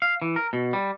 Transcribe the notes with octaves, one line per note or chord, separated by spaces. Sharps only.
F5
E3
A#4
B2
G3